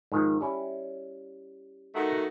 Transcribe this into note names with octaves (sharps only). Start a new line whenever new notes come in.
G#2 D#3 F3
G3 C#4 E4
D#3 A3 F#4